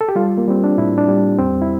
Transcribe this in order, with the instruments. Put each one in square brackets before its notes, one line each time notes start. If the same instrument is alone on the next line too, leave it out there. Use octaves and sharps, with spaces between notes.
[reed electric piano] A4
G4
G3 F4
A#3
G3 C4
D4
A2 E4
D4
G3
E2 C4
E4